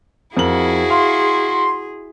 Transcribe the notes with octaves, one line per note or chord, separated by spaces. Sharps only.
F2 E4 F#4 G#4 A#4 F#7
F5 C6